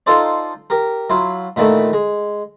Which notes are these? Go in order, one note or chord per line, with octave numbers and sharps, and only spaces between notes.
D#4 F4 A4 C5 D5
G4 A#4
F#3 E4 F4
A#2 D#3 E3 A3
G#3